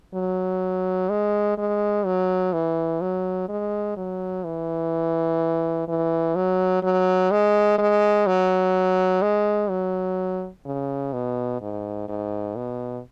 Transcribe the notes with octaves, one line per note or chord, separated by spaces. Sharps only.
F#3
G#3
G#3
F#3
E3
F#3
G#3
F#3
E3
E3
F#3
F#3
G#3
G#3
F#3
G#3
F#3
C#3
B2
G#2
G#2
B2